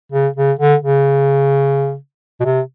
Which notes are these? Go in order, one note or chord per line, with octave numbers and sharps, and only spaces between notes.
C#3
C#3
D3
C#3
B2
C3